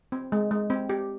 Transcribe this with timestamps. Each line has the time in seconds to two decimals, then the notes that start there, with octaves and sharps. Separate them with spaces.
0.12 C4
0.32 G#3
0.51 G#3
0.70 C4
0.89 G4